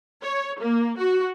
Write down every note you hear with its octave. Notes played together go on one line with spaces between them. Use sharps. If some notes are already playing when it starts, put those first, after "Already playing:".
C#5
A#3
F#4